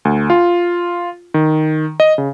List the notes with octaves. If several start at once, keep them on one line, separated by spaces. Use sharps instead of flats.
D2
F4
D#3
D#5
C#3